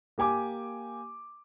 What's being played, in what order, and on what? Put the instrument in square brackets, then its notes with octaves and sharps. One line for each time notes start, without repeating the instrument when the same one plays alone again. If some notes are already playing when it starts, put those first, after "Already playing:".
[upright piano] A#3 G4 G#5 D6